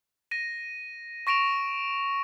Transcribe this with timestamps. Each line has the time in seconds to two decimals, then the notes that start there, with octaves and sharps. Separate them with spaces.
0.31 A#6 D#7
1.27 C#6 A#6 D7 E7 F7